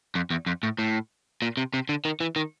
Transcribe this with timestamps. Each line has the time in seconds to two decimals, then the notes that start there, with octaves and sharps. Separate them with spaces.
0.15 F2
0.30 E2
0.46 F2
0.63 A2
0.79 A2
1.42 A#2
1.57 C3
1.74 C3
1.89 D3
2.05 D#3
2.20 E3
2.36 D#3